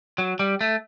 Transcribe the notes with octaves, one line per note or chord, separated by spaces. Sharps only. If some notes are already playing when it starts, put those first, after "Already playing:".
F#3
G3
A3